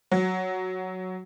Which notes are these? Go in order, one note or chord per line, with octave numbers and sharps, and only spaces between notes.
F#3